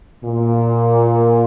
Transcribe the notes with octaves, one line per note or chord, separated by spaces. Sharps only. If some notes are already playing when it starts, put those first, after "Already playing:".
A#2